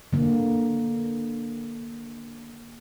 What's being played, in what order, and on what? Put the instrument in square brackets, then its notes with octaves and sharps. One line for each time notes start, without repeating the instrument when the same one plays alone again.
[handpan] D3 A#3